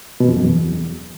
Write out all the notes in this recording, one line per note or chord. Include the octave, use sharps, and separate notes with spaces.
B2
F2
F#2
E2